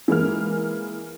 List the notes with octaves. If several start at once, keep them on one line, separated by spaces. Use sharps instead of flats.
E3 G#3 A#3 F6